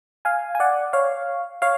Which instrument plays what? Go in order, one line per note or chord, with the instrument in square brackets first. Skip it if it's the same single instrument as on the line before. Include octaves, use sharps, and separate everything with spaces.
[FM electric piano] F5 G#5
G#5
D5 F#5
C#5 F5
C#5 F5